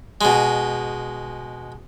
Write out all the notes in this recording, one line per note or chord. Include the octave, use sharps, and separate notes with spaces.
B2 G#3